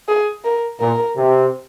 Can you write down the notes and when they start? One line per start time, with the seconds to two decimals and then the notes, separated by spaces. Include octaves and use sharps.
0.08 G#4
0.44 A#4
0.80 A#2 A#4
1.16 C3